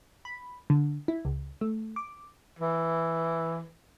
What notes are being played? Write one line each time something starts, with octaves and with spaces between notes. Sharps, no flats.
B5
D3
E4
C#2
A3
D6
E3